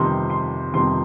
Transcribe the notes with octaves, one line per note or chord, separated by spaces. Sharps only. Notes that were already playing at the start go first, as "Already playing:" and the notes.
Already playing: G1 F2 C3 D#3 G3 C6
C6
G1 F2 C3 D#3 G3 C6